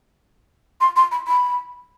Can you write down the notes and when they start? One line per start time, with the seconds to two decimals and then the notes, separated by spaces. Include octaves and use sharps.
0.81 C6
0.96 C6
1.12 B5
1.27 B5